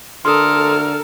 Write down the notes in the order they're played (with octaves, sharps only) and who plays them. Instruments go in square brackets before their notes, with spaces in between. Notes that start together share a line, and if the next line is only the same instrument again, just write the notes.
[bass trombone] D3 [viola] A4 A#4 [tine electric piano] C6 D#6 [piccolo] F6